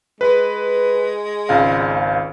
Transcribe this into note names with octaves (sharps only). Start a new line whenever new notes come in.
G#3 B4
G#1 C#2 F5